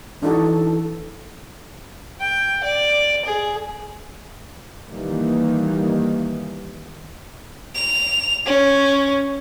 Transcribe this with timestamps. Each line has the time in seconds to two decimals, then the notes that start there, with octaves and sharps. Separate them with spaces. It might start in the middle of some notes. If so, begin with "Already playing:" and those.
0.23 E3 D4 D#4 F#4 A4
2.20 G5
2.64 D5
3.25 G#4
4.88 D#3 E3 G3 A#3
7.75 F7
8.46 C#4